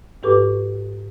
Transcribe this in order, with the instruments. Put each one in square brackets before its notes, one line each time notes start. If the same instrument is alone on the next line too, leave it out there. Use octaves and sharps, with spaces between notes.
[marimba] G#2 G4 A4 B4 C#6 D6